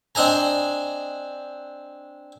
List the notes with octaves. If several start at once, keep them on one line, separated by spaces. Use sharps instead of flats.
C4 D4 D#5 G#5 A#5